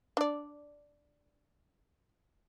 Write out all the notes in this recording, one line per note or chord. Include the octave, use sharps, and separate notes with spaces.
D4 D5